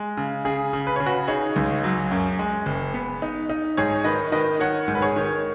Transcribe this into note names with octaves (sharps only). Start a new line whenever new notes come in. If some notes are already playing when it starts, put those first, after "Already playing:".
Already playing: G#3
C#3
C#3 G#4
C#3
B4
C#3 C#5
F#4 B4
D#4 G#4 C#5
C#2
F#3
F#2
G#3
F#1
B3
D#4
D#4
G#2 G#4 C#5
D#3 B4 D#5
D#3 B4 D#5
D#3 C#5 F#5
G#2
B4
G#4 C#5
D#3